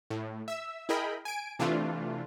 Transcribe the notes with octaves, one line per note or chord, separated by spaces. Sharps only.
A2
E5 E6
E4 G#4 A#4 D#5 G5 B5
G#5 D7
C3 E3 A3 D4 F4